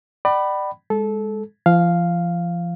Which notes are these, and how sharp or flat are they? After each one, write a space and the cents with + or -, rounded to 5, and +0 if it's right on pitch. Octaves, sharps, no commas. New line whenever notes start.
D5 +30 G5 -45 B5 +0
G#3 -20 A4 -20
F3 -35 F5 +0